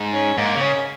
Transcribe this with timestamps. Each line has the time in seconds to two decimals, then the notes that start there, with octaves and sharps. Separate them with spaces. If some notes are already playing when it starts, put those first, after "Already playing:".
Already playing: G#2
0.13 C#4
0.38 G#2 A#3
0.55 C#3
0.61 C#4